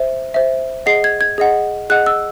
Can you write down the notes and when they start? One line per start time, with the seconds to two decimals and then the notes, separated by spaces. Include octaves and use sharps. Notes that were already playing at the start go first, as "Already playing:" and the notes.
Already playing: C5 E5
0.34 C5 E5
0.86 G#4 D#5 F#5 C7
1.04 G#6
1.21 G#6
1.38 G#4 D#5 F#5
1.90 G#4 D#5 F#5 F#6
2.06 E6